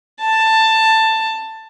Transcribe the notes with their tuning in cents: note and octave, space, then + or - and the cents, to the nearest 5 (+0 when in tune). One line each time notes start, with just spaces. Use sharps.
A5 +10